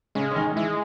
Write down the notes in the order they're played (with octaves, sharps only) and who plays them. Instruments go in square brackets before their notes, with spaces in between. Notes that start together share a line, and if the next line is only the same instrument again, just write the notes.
[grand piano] C#3 C#4 [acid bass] G#3
[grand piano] C#4
D#3 D#4
[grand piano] E3 E4 [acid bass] G#3